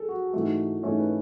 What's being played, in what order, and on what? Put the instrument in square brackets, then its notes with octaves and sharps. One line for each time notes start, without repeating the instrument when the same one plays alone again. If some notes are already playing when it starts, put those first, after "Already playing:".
Already playing: [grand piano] G#4 A4
F#4
[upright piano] G#2 E3 A3 [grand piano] F#4
[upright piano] G#2 E3 A3 [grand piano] C#4
[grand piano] B4